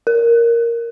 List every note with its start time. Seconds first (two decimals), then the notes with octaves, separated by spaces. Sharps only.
0.07 A#4